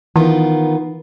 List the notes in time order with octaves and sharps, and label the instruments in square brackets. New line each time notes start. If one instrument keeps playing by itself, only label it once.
[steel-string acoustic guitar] D#3 B3 F4 [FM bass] E3